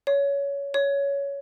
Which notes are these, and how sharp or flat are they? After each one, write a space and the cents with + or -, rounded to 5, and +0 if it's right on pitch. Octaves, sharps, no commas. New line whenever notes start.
C#5 +20
C#5 +15